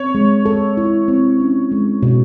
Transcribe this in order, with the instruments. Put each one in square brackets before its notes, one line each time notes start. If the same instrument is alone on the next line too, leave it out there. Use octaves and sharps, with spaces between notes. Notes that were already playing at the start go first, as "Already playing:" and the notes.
Already playing: [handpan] C4 [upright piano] C#5
[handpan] G#3
A4
E4
C4
C#4
G#3
B2